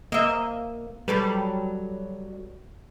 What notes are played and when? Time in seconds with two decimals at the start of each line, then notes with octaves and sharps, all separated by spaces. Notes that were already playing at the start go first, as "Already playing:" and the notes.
0.12 A#3 D#5 E5
1.08 F#3 G3 A4 B4